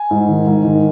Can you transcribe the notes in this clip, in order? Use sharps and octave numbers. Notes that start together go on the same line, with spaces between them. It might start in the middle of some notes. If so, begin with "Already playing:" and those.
Already playing: G#5
G#2
D#3
G#2
D#3